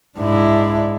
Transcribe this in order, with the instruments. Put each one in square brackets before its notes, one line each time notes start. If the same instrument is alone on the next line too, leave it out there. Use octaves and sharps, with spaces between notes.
[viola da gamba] G#2 [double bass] D4 E4